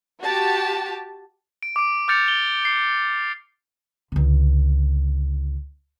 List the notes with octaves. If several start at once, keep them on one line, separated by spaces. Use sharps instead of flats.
F#4 G4 A5
D7
D6 D7
D6 F6 G6 A6 C#7 F7
G7
C7
C#2 D3